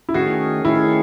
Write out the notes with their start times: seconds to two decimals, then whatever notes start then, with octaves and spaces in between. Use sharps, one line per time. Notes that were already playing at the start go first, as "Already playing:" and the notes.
0.09 E4
0.14 D#3 A3 C#4 F#4 G#4
0.65 D#3 A3 C#4 E4 G#4